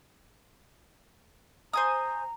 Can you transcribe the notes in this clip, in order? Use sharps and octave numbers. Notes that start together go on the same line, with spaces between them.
C5 G#5 A#5 D#6